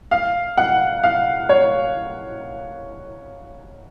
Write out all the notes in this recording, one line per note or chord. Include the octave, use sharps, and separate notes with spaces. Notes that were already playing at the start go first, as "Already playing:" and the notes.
F5
F#5
F5
C#5